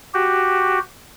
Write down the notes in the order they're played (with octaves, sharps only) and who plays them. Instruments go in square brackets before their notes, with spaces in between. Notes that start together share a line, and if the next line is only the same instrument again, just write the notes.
[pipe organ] F#4 G4